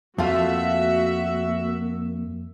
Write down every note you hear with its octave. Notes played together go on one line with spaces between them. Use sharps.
F2 A3 A#3 F4 F#4 E5 F5